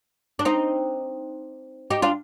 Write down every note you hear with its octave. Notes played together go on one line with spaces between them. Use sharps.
D4
C4 D#4
D#4 G4
D4 F4